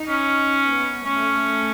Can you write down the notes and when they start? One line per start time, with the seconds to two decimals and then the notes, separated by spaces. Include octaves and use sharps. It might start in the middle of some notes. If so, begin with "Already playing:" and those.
Already playing: D#4
0.08 C#4
0.67 B3
1.05 A3 C#4